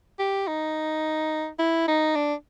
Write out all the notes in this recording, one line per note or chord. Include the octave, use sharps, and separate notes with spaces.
G4
D#4
E4
D#4
D4